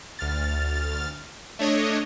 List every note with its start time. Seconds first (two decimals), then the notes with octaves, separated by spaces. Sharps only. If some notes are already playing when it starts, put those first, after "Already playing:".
0.19 D2 F6 A6
1.59 A3 D4 C#5 D#5